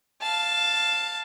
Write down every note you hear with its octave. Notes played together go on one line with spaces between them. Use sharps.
F5 A5